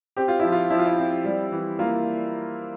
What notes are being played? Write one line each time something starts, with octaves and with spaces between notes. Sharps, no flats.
C4 G4
F4
F3 E4
F4
F3 E4
F4
E4
C4
G3
E3
A#3 F4